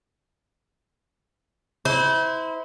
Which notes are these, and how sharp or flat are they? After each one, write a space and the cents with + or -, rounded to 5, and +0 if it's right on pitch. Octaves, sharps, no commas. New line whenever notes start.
E4 -30 C5 -30